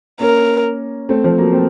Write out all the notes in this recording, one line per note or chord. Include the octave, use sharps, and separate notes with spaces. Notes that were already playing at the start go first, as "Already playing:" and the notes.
A#3 C#4 A#4
A3 C4
F3 A3
F#3 A#3
A3 C4